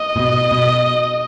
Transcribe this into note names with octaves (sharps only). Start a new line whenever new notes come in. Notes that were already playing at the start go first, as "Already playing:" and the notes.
Already playing: D#5
A#2
B2
B2